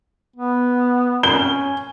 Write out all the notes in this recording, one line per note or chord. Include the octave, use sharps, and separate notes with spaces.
B3
C#4 G7